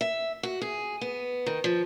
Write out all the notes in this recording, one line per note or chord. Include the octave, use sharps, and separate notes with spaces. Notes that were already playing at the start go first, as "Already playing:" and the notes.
E5
F#4
G#4
B3
D#3
F3